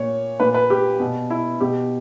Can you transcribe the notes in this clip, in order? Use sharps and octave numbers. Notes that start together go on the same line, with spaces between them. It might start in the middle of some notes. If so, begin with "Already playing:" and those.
Already playing: A#2 C#5
A#2 B4
B4
G4
B2
E4
B2 G4